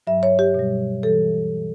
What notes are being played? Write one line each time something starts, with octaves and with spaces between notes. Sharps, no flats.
G2 F#3 E5
C#5
G4
B2 G3
E3 G3 A4